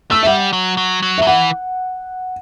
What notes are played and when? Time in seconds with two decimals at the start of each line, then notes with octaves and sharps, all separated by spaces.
0.11 A3 E6
0.23 E5
0.27 G3 F#5
0.53 F#3
0.77 F#3
1.02 F#3
1.18 E5
1.23 F#3
1.27 E3 F#5